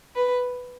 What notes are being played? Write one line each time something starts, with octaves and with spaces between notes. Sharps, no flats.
B4